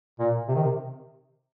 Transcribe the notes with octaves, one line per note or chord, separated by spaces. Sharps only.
A#2
C3
D#3
C3